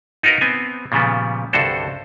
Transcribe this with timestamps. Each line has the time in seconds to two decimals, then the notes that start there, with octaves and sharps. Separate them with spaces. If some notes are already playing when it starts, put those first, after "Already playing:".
0.23 D#4 F4 F#4 A#4 B4
0.41 B3 C4 G#5
0.92 A#2 C#3 F3 G3 B3
1.53 C2 G2 D3 F#4 A4 C5